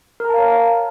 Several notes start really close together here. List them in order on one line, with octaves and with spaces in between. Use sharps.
A#4 A#5 A5 F5 C#5